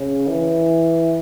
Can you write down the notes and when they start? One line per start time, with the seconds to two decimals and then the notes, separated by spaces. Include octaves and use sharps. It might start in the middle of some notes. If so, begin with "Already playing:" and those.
Already playing: C#3
0.28 E3